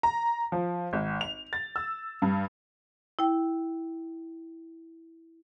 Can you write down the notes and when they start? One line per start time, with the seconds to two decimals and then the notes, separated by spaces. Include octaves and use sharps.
0.03 A#5
0.52 F3
0.93 G#1
1.21 F7
1.53 A6
1.76 E6
2.22 G2
3.19 E4 G5